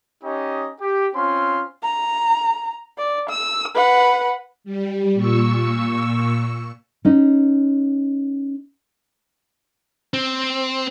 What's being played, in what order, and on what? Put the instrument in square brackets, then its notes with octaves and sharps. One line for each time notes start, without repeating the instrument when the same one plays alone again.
[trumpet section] C#4 D#4 G4 D#5
G4
C4 C#4 F4 C6
[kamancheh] A#5
D5
E6
B4 F#5
[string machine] G3
A#2 C#6 E6
[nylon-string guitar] C#4 D#4
[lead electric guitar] C4